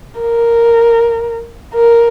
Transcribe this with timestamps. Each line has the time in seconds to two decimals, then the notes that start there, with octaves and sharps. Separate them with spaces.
0.21 A#4
1.74 A#4